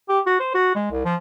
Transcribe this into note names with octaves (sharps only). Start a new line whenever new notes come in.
G4
F#4
C5
F#4
G#3
C2
F3